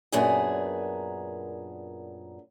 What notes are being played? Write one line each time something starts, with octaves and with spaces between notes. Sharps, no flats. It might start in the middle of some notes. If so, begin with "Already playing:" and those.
F#2 A#2 B3 D4 G#4 G#5